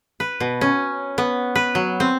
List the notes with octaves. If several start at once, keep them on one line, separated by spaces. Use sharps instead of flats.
B4
B2
C#4
B3
B4
F#3
C4